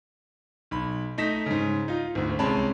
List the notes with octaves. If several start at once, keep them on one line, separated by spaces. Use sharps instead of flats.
B1 B5
A3 D#4 D#5 A#6 B6 E7
G#2 C#3
D#4 F4
G#1 D2
C2 G#3 C4 C#4 A5 B5